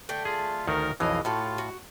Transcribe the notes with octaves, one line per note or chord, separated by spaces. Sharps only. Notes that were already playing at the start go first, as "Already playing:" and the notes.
D3 A3 G5
F4 G#4
D2 D#3 A#4 F#5
B1 F2 E3 D#5 F5
A2 F4 F#4 A4
F#4